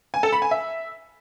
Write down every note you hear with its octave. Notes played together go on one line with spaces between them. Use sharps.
G#5
A4
B5
G#5
E5